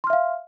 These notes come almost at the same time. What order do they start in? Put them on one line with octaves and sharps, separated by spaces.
C6 F6 E5 F5